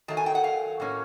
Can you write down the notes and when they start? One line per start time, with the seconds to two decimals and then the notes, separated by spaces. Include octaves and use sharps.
0.08 D#3 F#3 A3 A5
0.17 G#5
0.26 G5
0.35 F#5
0.44 F5
0.80 A2 F#3 A#3 C#4